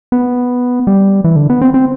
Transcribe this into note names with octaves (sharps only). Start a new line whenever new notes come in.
B3
G3
E3
D3
B3
C4
C4